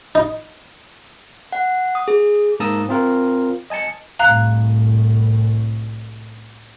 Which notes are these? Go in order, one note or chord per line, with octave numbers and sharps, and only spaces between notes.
D#4
F#5
D#6
G#4
G#2 A#3 A5 A#5 D#6 E6
C4 F4 A#4
D#5 G#5 A5 C#7
C2 A2 F5 A#5 F#6